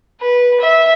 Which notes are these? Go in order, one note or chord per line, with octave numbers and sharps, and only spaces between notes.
B4
E5